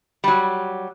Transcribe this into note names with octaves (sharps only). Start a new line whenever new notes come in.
F#3 G3